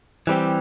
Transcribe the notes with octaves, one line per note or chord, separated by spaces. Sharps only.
E3 G3 C4 G4